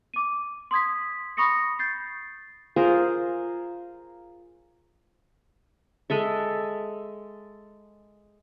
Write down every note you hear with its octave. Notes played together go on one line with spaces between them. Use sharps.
D6 D#7
C6 D#6 G#6 B6
B5 C#6 D#6 A#6 C#7
G6 A6 C7
F4 G#4 A#4 C5
G#3 A4 E5